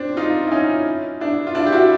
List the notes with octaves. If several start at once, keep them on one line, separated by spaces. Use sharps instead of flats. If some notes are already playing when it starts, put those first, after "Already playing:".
Already playing: C4 D4
D#4 F4
E4
C#4 D#4
D4 E4
F4
D4 E4
G4
E4 F#4